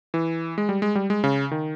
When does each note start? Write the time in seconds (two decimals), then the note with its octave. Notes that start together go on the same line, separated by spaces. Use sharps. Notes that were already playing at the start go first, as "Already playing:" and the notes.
0.14 E3
0.58 G#3
0.69 G3
0.82 G#3
0.95 G3
1.10 G#3
1.24 C#3
1.51 D#3